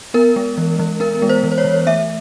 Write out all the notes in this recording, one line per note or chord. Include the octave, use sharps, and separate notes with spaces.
B3 A#4
G#3
E3
E3
B3 A#4
G#3
C5
E3
C5
C#5
E3
A3 E5